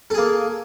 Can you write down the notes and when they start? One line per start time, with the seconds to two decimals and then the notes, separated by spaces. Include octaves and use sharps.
0.10 A4
0.14 G#4
0.18 A#3